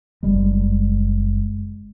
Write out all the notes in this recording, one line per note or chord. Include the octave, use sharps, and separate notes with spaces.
F#1 G3 G#3